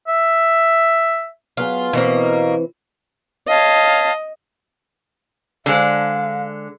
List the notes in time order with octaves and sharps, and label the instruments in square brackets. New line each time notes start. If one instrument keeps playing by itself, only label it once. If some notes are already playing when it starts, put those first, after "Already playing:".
[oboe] E5
[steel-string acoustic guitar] F#3 B3 G#4 [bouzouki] F4
[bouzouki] B2 A#3 [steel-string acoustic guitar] E3 C4
[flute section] C#5 F5 A5 [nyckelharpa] D#5
[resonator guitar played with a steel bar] D3 G#3 C5 [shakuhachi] F5